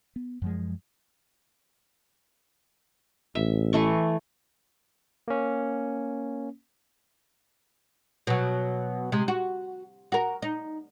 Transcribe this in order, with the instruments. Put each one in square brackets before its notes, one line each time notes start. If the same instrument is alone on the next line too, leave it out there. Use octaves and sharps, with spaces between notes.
[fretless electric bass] B3
F#2 F3 G#3
[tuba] A1 [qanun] E5
[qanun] E3 A3 C#6
[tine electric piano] A#3 C#4
[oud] B2 F#3
C3 G#3
F#4
F#4 A#4
D#4